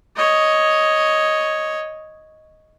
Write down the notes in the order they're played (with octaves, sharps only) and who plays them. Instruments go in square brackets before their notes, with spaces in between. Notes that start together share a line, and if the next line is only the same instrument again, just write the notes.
[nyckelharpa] C#5 D#5